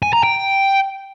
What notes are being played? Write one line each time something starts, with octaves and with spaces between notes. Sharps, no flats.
G#5
A#5
G5